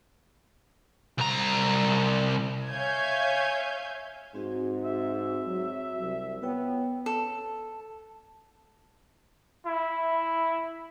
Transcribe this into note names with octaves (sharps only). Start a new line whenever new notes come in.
C2 A#5
C#5 E5 F5 G#5 G6 G#6
G#2 C4 F#4
E5
F#3
C2
B3 F4 C#5 G5
A4
E4